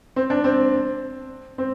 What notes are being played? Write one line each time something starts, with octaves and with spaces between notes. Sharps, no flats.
C4
D4
C4
C4